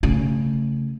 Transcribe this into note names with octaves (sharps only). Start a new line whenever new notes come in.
C#3 A3